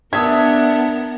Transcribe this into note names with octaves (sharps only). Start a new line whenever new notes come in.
B3 D4 A#4 E5 A5 D#6 G#6